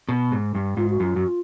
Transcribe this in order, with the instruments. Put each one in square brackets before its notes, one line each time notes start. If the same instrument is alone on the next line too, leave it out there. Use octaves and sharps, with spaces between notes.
[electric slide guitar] B2
G#2
G2
[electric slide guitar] G#2 [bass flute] F4
[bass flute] F#4
[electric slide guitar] F#2 [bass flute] F4
[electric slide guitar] F#2 [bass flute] F#4
[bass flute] F4